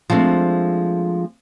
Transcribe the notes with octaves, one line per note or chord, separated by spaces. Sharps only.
F3 G#3 A3 C4 D4